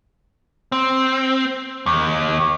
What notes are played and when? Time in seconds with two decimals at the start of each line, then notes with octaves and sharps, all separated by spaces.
0.72 C4
1.86 D#2